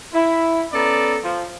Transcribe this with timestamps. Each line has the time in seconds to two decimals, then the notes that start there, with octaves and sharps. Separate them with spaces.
0.13 E4
0.73 B3 C#4 A4 D5 A#5
1.23 F3